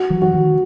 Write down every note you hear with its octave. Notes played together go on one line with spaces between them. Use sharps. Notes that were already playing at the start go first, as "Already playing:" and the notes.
Already playing: F#4
E3 F#3
F#4
D#3 F3